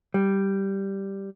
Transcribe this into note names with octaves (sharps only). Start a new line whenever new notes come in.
G3